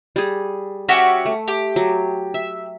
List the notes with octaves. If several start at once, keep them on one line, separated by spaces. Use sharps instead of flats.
G3 G#4
C#4 F#4 G4 E5
A3
G4
F#3
E5